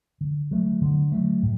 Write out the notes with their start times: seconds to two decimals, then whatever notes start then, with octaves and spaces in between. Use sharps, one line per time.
0.21 D3
0.51 F#3 A3
0.81 D3
1.12 F#3 A3
1.43 A2